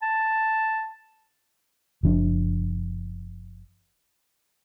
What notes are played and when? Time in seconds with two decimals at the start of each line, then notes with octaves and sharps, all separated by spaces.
0.02 A5
2.03 F#1 F3 D4